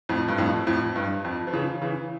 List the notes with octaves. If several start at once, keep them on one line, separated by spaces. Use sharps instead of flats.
F2 A2
G2
F2 A2
F2 A2
G2
F2
F3
C#3 E3
C#3 E3